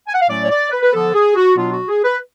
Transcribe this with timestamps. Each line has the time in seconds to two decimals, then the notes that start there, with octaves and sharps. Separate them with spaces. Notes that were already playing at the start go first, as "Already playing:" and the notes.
0.07 G#5
0.14 F#5
0.22 F5
0.28 A2 F#3 A3 C#4 D5
0.43 C#5
0.50 D5
0.71 B4
0.82 B4
0.93 D3 F3 B3 A4
1.14 G#4
1.36 F#4
1.56 B2 F#3 B3 D4 F4
1.72 F#4
1.89 G#4
2.04 B4